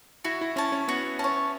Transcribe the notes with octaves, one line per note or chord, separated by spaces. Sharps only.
E4 F#4
E4
C#4 C#5 A5
C#4
B3 F#4
C#4 C#5 A5